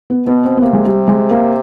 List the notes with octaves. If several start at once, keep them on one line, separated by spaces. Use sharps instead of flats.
B3
B2 B3
C4
B3
C3 A#3
G#3
G3
G#3
A#3